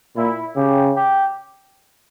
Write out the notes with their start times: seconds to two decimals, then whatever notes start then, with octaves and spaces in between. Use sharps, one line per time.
0.17 A#2 E4
0.56 C#3 G4
0.96 G4